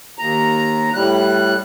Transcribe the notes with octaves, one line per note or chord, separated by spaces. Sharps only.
D#2 A#5
A2 G3 F#6